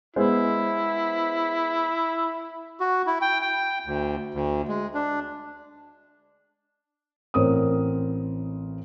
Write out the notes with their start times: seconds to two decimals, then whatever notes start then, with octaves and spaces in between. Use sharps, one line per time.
0.16 G#3 B3 E4 C5
2.80 F#4
3.07 E4
3.22 G5
3.41 G5
3.86 D2
4.34 D2
4.68 G#3
4.94 D4
7.34 A1 C4 A#4 C5 C#5 D#6